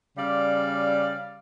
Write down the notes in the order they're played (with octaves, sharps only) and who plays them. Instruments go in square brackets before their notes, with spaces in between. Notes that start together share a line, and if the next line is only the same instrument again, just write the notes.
[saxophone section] C#3 G3 D5 F5